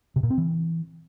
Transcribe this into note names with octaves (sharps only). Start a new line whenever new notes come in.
C3
A#2
C4
E3